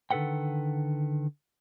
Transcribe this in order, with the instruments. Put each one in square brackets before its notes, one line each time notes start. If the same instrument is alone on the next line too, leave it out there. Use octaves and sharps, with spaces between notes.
[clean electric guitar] D3 D#3 A4 B4 F#5 G5